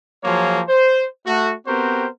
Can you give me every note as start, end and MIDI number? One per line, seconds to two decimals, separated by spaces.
0.23 0.61 53
0.23 0.61 54
0.23 0.61 58
0.23 0.61 65
0.23 0.61 68
0.23 0.61 73
0.68 1.05 72
1.26 1.52 57
1.26 1.52 66
1.67 2.06 59
1.67 2.06 60
1.67 2.06 66
1.67 2.06 67
1.67 2.06 70
1.67 2.06 72